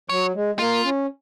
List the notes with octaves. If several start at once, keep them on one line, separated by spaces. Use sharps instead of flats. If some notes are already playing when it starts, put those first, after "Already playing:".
F#3 C#5
G#3
G#3
A#3 F4
C#4